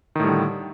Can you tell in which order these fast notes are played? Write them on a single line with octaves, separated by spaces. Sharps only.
D#3 A2 G3 D3